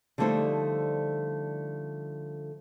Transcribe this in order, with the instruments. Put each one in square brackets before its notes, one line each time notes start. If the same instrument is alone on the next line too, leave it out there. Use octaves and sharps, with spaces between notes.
[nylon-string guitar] D3 F3 G3 A3 D#4 C5